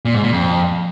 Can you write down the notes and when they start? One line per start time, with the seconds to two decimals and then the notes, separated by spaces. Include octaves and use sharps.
0.05 A#2
0.14 G#2
0.24 A#2
0.33 F2